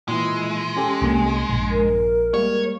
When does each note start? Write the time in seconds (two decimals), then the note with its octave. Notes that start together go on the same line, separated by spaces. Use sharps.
0.09 A#2 E3 G#3 E4
0.77 C#4 G4 A4 G#5
1.02 C2 A#3
1.49 A#1 G2
1.71 A#4
2.34 G3 G#3 A#3 C#5